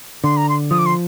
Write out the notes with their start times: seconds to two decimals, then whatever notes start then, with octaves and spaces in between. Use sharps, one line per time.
0.24 D3 C6
0.37 A#5
0.49 C6
0.71 F3 D#6
0.79 D6
0.86 C6